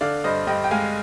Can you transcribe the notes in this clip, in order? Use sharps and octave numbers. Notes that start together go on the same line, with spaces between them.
D3 D5 F5
G2 C5 D#5
G2 D#5 G5
G5
G#3 F5 G#5